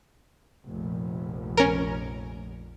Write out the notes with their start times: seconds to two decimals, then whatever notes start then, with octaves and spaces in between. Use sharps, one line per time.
0.64 F1 A#1
1.57 C#4 A#4